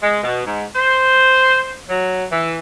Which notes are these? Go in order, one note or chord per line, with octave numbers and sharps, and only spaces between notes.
G#3
B2
G#2
C5
F#3
E3